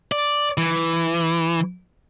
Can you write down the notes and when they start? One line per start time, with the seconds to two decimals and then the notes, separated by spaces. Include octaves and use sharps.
0.12 D5
0.58 E3